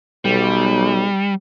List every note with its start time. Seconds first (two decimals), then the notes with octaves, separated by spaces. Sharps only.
0.25 B1 G3